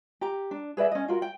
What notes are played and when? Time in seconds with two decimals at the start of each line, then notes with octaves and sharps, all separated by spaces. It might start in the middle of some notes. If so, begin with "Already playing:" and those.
0.21 G4 A#5
0.51 D4
0.77 G#4 B4 D5 E5
0.92 C#4 D#5
1.08 F4 F#4 A#4
1.22 G5